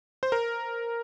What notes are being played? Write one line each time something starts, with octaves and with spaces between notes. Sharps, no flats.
C5
A#4